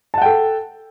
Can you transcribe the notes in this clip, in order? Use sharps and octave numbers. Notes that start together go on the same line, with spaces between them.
A4 F#5 G5 A5